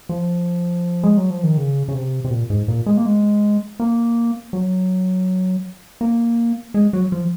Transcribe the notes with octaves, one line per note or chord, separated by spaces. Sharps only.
F3
G#3
F#3
F3
D#3
C#3
C#3
C3
C3
A#2
G#2
A#2
G#3
A#3
G#3
A#3
F#3
A#3
G#3
F#3
F3